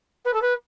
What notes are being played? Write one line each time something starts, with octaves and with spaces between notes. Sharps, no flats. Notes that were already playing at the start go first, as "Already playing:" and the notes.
B4
A4
B4